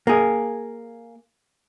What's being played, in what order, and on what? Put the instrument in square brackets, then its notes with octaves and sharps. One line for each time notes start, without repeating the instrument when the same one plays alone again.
[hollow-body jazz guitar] A#3 G#4